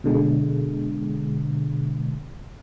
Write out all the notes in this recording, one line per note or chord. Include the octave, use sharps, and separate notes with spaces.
B2 D3 G#3